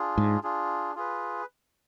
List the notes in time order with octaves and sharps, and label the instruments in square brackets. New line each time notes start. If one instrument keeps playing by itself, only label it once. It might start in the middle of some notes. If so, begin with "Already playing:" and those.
Already playing: [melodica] D4 F4 G#4
[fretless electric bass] G#2
[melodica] D4 F4 G#4
F4 G#4 B4